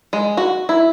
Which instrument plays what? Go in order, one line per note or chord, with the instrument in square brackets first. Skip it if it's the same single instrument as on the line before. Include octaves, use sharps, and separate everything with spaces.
[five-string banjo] G#3
F#4
E4